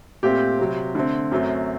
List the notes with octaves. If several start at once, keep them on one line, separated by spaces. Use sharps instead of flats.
A#2 A3 C4 G4
C3 F#3 C4
D3 A3 C4
F#2 F#3 A3 C4